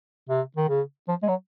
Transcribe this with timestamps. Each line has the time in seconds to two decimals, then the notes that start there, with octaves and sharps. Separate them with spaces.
0.29 C3
0.57 D#3
0.69 C#3
1.08 F3
1.23 G#3
1.29 F#3